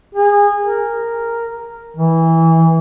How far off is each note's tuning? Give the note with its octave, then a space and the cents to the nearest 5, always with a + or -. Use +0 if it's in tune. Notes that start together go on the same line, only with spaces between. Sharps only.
G#4 -25
A#4 -5
E3 -15